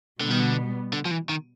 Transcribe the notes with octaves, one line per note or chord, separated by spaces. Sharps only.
B2 D3 G3 B3
D#3
D3
D3
F3
E3
D#3